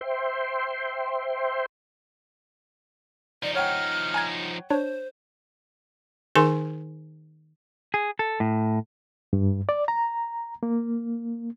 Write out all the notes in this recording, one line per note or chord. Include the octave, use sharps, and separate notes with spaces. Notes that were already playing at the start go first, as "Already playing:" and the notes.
C5 E5 G5 C6
F3 D#4 D5
C#5 F#5 G5 F6
G#5 A#5 G#6
D4 C5 C#5
D#3 D#4 G#4 A#4 G#5 C6
G#4
A4
A2
G2
D5
A#5
A#3